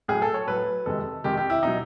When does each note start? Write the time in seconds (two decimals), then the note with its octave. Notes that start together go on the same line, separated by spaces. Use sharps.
0.08 A2 F#3 G#4
0.22 A4
0.34 C#5
0.47 A2 F#3 B4
0.86 F2 C3 D#3 G#3 A4
1.24 F2 C3 D#3 G#3 G4
1.37 G4
1.50 E4
1.63 B2 F#3 D#4